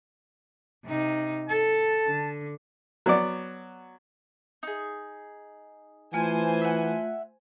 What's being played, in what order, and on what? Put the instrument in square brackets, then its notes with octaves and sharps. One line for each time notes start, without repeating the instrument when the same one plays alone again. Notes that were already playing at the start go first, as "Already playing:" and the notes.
[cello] C3 D#4
[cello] A4 [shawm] A5
[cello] D3
[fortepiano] F#3 B3 D5
[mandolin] D#4 G#4
[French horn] E3 [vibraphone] A3 F4 [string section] C5 G#5
[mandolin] E5 F#5